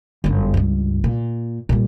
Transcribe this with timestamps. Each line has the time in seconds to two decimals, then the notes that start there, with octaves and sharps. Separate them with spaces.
0.24 G1 F#2
0.54 C#2 G2
1.04 A#2
1.69 A#2 G3